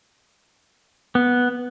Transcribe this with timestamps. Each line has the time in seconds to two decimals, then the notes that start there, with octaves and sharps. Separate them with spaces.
1.15 B3